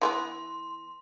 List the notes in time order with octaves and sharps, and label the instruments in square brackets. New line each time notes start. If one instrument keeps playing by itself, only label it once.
[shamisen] E3 A3 B3 [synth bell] C6